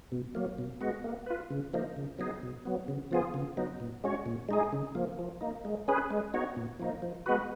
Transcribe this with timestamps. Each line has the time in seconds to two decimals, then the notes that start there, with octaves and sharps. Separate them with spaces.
0.12 B2
0.35 F#3 A#3
0.58 B2
0.81 G#3 B3 F#4
1.04 A#3
1.26 F4 B4
1.50 C#3
1.74 F3 A#3 D#4
1.97 C#3
2.19 F#3 B3 D#4 G#4
2.43 B2
2.65 F#3 B3
2.88 C#3
3.11 F3 B3 F4 G#4
3.34 C#3
3.57 F#3 B3 D#4
3.80 A#2
4.04 G#3 C#4 F#4 C#5
4.26 A#2
4.49 G#3 D#4 G#4
4.73 C#3
4.95 F3 A#3
5.19 F3
5.41 A#3 D#4
5.65 G#3
5.88 C#4 G#4 B4
6.11 G#3
6.34 B3 D#4 F#4 C#5
6.56 A#2
6.79 F3 A#3 D#4
7.02 F3
7.26 G#3 B3 F#4 B4